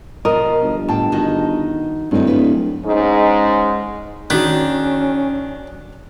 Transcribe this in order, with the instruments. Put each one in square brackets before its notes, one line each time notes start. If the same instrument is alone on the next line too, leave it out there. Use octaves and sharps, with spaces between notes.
[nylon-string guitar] B2 F3 [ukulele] A#4 D#5
[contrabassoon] G1
[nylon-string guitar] A2 G5 [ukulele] A5
[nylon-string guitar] D#3 D#4 F#4
[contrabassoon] D1 [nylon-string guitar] G2 D#4
[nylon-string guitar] B3 B4
[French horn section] G#2 G#3 C#4 D#4
[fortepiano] D#3 [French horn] C#4 [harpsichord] D4 [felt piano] F#4 G#4 B6